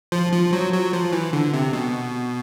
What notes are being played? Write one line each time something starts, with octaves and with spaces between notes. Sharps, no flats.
F3
F3
F#3
F#3
F3
E3
D3
C3
B2